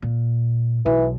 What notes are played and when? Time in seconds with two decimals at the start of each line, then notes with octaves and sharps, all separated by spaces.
0.02 A#2
0.86 B1 E3